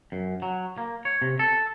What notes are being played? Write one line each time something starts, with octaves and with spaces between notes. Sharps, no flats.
F#2
F#3
A#3
C#5
C3
A4